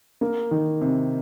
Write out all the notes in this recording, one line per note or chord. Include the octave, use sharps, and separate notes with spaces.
A#3
D#3
C3